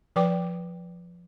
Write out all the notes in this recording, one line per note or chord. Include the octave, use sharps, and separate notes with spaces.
F3 B4 G5 D6